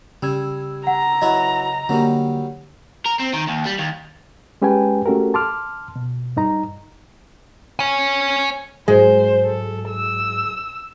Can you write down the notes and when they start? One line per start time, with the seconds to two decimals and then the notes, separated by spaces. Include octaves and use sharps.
0.23 C#3 G3 E6 G#6
0.87 F#5 A#5
1.22 F#3 E4 B4 D#5
1.89 D3 F#3 G3 A#3
3.05 A#4
3.19 C4
3.34 D#3
3.49 D#2
3.67 G3
3.79 D#2
4.62 G#3 C#4 G4 B4 G5 G#5
5.06 A3 C#4 F#4 G4 A4 A#4
5.34 A5 C6 D6 F6
5.96 B2
6.37 G2 D#4 A#5
7.79 C#5 G#5
8.88 G#2 F#3 G#3 G#4 C5
9.45 A4
9.89 E6